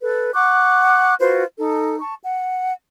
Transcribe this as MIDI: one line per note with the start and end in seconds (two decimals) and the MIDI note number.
0.02 0.31 69
0.02 0.31 71
0.33 1.14 78
0.33 1.14 85
0.33 1.14 86
0.33 1.14 90
1.19 1.44 65
1.19 1.44 66
1.19 1.44 71
1.19 1.44 72
1.58 1.99 63
1.58 1.99 69
2.00 2.14 81
2.00 2.14 85
2.22 2.72 78